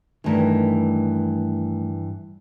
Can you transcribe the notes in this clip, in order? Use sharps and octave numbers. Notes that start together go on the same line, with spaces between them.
G2 D#3 E3 A3 A#4